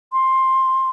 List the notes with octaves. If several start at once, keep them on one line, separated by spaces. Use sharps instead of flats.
C6